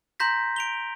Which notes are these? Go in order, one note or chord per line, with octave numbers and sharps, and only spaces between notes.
A#5 C6 G6 A#6 B6
D7 F7 G7